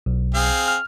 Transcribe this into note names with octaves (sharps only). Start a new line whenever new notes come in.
B1
C4 G#4 F5
F6